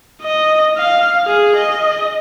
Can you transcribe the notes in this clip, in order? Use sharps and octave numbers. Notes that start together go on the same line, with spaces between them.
D#5
F5
G#4
D#5